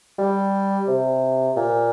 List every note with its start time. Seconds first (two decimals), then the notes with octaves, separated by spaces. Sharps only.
0.18 G3
0.88 C3
1.56 A#2